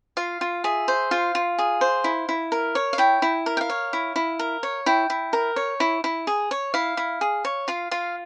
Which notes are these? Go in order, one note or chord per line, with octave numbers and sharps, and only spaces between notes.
F4 F5
F4
G#4 E5
C5
F4 F5
F4
G#4
C5
E4
E4
A#4
C#5
F5
E4 G5
E4
A#4
G5
F5
C#5
E4
E4
A#4
C#5
E4 G5
E4
A#4
C#5
E4
E4
G#4
C#5
E4 F5
E4
G#4
C#5
F4 F5
F4 F5